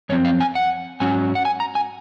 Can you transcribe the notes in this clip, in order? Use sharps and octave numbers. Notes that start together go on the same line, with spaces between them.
F#2 F3 C4 C#5
F5
G#5
F#5
G#2 F#3 C#4 G#5
F#5
G#5
A#5
G#5